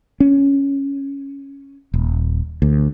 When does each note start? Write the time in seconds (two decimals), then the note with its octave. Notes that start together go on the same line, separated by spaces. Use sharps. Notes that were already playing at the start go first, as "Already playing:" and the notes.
0.20 C#4
1.94 D#1
2.62 D2